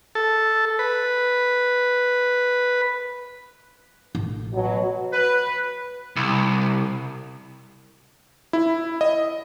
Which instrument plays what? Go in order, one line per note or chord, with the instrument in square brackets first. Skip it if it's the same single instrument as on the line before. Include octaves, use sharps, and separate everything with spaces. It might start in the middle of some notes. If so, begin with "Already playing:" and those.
[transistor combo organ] A4
B4
[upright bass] A1
[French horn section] B2 F#3
[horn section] B4
[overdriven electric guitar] C2
[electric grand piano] E4
D#5